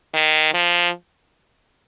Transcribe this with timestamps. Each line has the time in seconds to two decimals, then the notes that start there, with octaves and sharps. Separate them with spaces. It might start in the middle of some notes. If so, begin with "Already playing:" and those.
0.14 D#3
0.54 F3